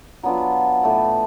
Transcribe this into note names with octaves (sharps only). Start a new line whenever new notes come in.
F#3 B3 D4 F4
A2 E3 A3